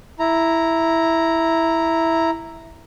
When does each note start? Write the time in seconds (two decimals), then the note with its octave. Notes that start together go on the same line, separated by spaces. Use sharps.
0.19 E4 A#5